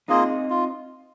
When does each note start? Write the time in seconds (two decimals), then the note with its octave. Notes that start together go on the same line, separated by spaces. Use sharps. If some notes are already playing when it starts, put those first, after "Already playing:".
0.08 A#3 C4 D#4 F4 G#4 D#5
0.50 F4